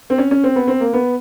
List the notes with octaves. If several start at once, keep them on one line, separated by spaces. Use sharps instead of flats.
C4
C#4
C#4
C4
B3
C4
A#3
B3